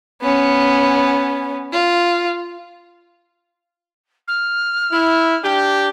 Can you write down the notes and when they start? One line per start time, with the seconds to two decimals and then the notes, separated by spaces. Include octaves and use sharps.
0.22 B3 C#4
1.73 F4
4.28 F6
4.91 E4
5.43 D4 G4